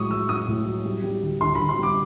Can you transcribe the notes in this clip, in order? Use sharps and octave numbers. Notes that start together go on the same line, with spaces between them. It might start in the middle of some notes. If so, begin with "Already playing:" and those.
Already playing: A2 F#3 G#3 C#6 D#6
F#3 E6
F#3 D#6
A2
F#3
G3
G3
D2
D2 C6
D2 B5
C6
G3 D6